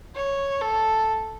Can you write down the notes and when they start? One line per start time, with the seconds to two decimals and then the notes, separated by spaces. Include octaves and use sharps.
0.15 C#5
0.61 A4